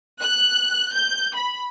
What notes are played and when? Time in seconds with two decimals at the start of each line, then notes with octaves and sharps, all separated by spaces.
0.21 F#6
0.93 G6
1.36 B5